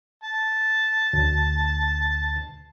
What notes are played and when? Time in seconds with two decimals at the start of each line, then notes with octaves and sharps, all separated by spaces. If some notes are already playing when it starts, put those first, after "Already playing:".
0.23 A5
1.13 D2